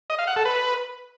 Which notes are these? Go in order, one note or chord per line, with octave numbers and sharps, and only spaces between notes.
D#5
F5
F#5
A4
B4